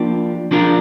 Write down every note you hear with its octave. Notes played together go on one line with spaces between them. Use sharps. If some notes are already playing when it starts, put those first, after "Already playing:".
Already playing: F3 A#3 D4 G4
F3 D4 F4 A#4